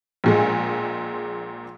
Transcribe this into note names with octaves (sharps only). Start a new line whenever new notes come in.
A#1 A#2 G#3